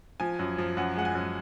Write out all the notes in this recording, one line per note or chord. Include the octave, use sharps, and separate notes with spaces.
F3 G#5
F#2
F3
F#2 F#5
G#3 F#5
G#5
F#2